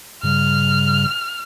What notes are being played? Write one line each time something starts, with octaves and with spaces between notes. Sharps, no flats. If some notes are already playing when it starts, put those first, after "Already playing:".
G2 C#3 G3 F6